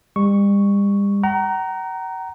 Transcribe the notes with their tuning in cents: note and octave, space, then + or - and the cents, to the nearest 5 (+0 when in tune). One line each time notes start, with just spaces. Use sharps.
G3 +40 C#6 +0
F#5 +45 A#5 +0